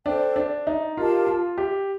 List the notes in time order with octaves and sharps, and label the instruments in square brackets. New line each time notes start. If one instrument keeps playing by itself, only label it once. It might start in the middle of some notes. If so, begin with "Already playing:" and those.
[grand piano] D4 [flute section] A4 C5 G5
[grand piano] D4
D#4
[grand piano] F4 [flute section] G4 A#4 F5 A5
[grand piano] F4
G4